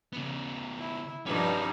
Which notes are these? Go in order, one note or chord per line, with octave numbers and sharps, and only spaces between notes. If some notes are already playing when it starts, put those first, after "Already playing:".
C#3 B3
E4
G2 F3 C#4 D#4 B4